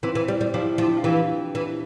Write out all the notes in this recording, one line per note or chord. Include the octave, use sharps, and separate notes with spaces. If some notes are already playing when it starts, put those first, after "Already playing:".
E3 C4 E4
E3
G3
G3
F3 E4 G4
F3
D4
E4
F4
E3 E4 G4
E3